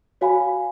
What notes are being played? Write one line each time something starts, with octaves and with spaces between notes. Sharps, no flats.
F#4 C#5 F5 G#5 B5